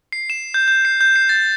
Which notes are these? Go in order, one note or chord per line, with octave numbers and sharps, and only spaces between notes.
C7
E7
G6
G6
C7
G6
C7
A6